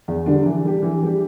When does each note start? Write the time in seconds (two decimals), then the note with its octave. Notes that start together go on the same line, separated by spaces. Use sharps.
0.08 E2
0.26 D3 G3 D4
0.46 E3
0.64 G3 D4 G4
0.83 E3
1.03 G3 D4 G4